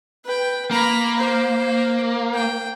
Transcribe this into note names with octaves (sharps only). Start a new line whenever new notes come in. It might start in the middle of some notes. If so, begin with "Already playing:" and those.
B4 G5
A#3 A#5 B5
C5
G5